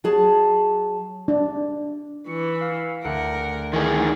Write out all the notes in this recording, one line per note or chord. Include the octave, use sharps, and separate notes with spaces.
F#3 G#4 A5
D4
E3 C#6
F5
D2 A#4 F#5
D#3 E3 D#4 G#4 A#4